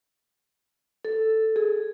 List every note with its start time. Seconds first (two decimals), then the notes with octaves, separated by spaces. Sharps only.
1.05 A4
1.56 G#4